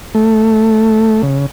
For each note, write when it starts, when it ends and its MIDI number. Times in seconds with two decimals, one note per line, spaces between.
0.15 1.22 57
1.23 1.46 49